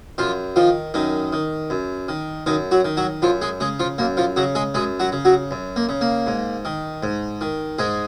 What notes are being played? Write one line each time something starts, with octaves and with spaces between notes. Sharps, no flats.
F#2 F3 F4
D#3 F3 F4
F#2 D#3 D#4
D#3
F#2
D#3
F#2 D#3 D#4
F#3 F#4
D#3
F#3 F#4
F#2 F3 F4
G#3 G#4
C#3 G#3 G#4
F3 F4
F#2 A#3
F3 F4
C#3 F#3 F#4
G#3 G#4
F#2 G#3 G#4
F#3 F#4
C#3
F#3 F#4
F#2
A#3
C#3
A#3
G#2
D#3
G#2
D#3
G#2 G#3 G#4